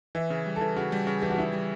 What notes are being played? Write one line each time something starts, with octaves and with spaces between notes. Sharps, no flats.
E3 E5
C#3
G3
A4
E3
C#3 F#4
G3
C#3
E3 G4
F#4
C#3 E4
G3